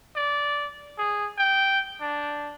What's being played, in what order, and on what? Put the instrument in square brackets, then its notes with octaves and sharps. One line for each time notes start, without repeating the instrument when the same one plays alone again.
[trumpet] D5
G#4
G5
D4